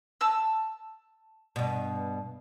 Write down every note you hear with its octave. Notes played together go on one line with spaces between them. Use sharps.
A5 E6
G2 B2